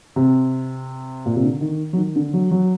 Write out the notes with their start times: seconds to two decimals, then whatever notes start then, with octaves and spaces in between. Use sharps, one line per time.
0.16 C3
1.26 A#2
1.36 C3
1.44 D3
1.61 D#3
1.93 F#3
1.97 D#3
2.16 D3
2.34 F#3
2.51 F#3